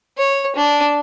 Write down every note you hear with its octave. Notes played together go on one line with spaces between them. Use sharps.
C#5
D4